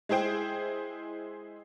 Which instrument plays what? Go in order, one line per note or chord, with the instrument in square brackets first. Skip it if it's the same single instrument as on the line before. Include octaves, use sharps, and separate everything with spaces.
[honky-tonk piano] G#3 E4 G#4 C5 G5